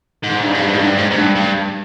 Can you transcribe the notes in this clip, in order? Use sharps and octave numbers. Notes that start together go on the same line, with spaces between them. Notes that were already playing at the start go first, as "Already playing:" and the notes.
G#2
G2
G#2
G2
G#2
G2
G#2
G#2
G2
G2